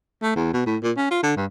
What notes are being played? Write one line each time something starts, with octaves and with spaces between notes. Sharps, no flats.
A3
E2
B2
A2
A#2
C#4
F4
D3
G2